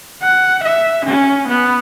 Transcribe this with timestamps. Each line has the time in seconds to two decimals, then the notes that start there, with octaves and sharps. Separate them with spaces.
0.22 F#5
0.64 E5
1.06 C#4
1.48 B3